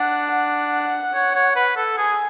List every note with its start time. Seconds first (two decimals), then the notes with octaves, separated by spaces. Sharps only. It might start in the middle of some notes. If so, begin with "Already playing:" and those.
Already playing: D4 F#5
0.31 F#5
1.15 C#5
1.35 C#5
1.56 B4
1.77 A4
1.97 G#4 G#5